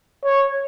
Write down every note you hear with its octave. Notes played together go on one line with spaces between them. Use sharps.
C#5